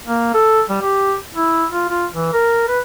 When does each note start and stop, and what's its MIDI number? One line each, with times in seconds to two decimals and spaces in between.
0.07 0.32 58
0.34 0.62 69
0.70 0.79 55
0.82 1.15 67
1.35 1.66 64
1.72 1.87 65
1.89 2.06 65
2.14 2.30 52
2.33 2.66 70
2.68 2.79 71